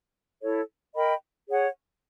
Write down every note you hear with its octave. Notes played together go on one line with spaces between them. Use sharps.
E4 A4 C#5
A#4 D#5 G5 B5
G#4 C#5 F#5